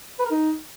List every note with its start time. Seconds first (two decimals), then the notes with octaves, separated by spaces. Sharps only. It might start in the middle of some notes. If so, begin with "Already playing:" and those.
0.19 B4
0.25 A#4
0.30 D#4